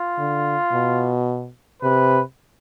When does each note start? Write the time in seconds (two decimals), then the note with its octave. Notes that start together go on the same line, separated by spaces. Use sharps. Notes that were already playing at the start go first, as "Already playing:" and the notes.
Already playing: F4
0.18 D3
0.72 B2
1.82 C3 B4